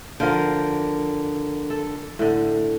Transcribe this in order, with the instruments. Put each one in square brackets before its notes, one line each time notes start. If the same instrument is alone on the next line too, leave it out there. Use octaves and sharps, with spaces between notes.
[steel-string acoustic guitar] D3 A#4 [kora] F3 F5 G5
[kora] A4
A2 D3